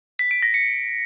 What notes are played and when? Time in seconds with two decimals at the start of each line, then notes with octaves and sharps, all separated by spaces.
0.19 B6
0.31 D7
0.43 A#6
0.54 C#7